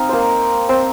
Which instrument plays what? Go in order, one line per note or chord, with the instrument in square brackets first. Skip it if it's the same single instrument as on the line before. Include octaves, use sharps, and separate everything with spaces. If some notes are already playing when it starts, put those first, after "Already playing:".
Already playing: [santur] C4 D#4 D#5 F5
A#3 A#4 C5
C4 C5